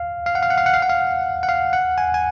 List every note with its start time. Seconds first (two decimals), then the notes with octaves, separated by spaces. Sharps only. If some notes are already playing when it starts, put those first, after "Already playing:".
Already playing: F5
0.26 F5
0.35 F#5
0.43 F5
0.50 F#5
0.58 F5
0.66 F#5
0.73 F5
0.82 F#5
0.89 F5
1.43 F#5
1.49 F5
1.73 F#5
1.98 G#5
2.14 G#5